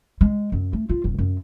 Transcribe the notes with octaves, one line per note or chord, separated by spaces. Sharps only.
G#3
F#2
A3
F4
D#1
F#2